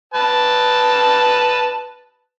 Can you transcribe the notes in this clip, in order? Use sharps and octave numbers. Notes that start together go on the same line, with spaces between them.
B4 A5